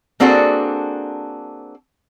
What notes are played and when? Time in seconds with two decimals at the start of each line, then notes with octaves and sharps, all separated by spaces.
0.20 A#3 C4 D4 F#4 G#4 A4